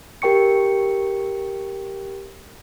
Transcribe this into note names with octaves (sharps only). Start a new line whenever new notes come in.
G4 A#4 G5 C#6 C#7